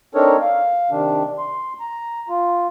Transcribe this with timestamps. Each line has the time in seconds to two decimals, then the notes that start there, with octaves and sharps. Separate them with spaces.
0.15 C4 D4 D#4 A4 A#4 C#5
0.41 F5
0.91 C3 D#3 D4
1.38 C6
1.80 A#5
2.28 F4